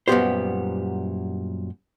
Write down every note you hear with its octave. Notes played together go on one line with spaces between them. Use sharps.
F#2 A#2 G3 B3 G4 C5